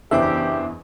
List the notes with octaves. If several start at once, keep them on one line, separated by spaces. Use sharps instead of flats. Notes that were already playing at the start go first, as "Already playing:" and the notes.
F#1 E2 E3 D4 G4 C5 E5 D6